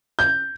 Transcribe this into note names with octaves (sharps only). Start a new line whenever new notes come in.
G6